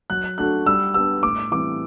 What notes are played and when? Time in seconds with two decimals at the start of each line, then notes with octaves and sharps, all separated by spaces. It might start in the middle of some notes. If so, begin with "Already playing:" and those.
0.10 F#3 F#6
0.38 A3 D4 F#4 A4 F#6
0.66 G3 E6
0.94 B3 D4 G4 B4 E6
1.23 A2 D6
1.52 E3 G3 C4 D6